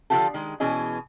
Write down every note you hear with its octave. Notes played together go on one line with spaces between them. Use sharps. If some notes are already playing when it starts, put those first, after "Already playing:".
D3 F3 C4 F4 G4 A4
D#3 G#3
B2 E3 C#4 G#4 D#5